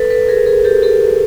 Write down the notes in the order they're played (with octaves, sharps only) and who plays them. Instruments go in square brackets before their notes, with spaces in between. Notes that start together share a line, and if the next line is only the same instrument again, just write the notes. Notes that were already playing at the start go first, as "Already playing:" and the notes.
Already playing: [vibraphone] A4 B4
A4 B4
G#4 A#4
G#4 A#4
G4 A4
G4 A4